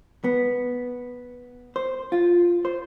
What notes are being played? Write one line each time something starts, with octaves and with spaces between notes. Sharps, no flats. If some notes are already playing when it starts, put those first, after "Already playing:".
B3
C5
F4
C5